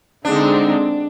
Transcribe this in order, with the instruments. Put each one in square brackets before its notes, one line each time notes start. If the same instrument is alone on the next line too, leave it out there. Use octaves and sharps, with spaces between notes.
[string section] D3 G#3 C4 D#4 [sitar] D4